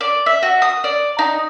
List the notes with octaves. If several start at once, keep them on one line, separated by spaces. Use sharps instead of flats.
D5
E5
F#4
D#6
D5
D#4